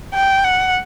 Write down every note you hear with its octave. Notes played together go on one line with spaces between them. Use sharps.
G5
F#5